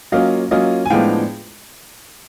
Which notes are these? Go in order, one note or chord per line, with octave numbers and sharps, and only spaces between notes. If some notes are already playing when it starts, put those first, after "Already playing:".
F#3 A#3 C#4 F4 D#5 F5
F#3 A#3 C#4 F4 D#5 F5
G#5
A2 F3 G#3 B3 D4 F5 G5